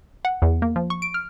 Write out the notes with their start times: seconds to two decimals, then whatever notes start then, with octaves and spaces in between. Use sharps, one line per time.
0.25 F#5
0.42 E2
0.62 A#3
0.76 F3
0.90 C#6
1.02 D7
1.14 F6